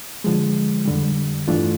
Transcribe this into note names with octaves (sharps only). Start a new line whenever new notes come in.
D3 F3 G#3
F2 D3 G3
G2 E3 A3 D4 F4